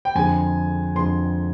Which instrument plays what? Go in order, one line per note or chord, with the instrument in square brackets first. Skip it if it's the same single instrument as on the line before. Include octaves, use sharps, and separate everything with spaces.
[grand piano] G5
F2 D3 G#3 G#5
F2 D3 G#3 C6